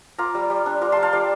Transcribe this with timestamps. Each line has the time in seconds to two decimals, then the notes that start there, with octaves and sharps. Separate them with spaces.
0.18 F4 A#5 D6
0.35 G3
0.50 G3
0.66 D4
0.81 F4 A#5 D6
0.92 G3 A5 C6
1.03 F5 A5
1.13 G3 D5 F5